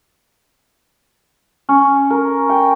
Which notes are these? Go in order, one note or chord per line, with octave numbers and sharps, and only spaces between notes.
C#4
A#4
G5